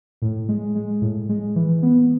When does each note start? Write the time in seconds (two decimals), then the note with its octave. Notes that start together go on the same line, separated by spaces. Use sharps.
0.22 A2
0.49 G#3
0.75 G#3
1.02 A2
1.29 G#3
1.56 E3
1.83 B3